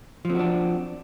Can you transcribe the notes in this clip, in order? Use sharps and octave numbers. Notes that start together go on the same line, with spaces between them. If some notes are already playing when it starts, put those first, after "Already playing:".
F3 C4 D4 F#4